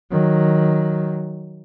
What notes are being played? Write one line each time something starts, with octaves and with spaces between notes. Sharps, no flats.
D#3 F#3